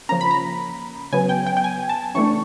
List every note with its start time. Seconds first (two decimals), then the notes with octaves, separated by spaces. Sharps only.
0.09 C#3 F3 A#3 C#4 A#5
0.21 B5
0.31 A#5
1.12 C#3 F#3 B3 G#5
1.29 G5
1.47 G5
1.57 G5
1.64 G#5
1.89 A5
2.15 C#3 E3 A3 D4 C#6